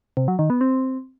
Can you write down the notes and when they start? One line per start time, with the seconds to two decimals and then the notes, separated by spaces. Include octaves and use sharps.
0.17 C3
0.28 F#3
0.39 D#3
0.50 B3
0.61 C4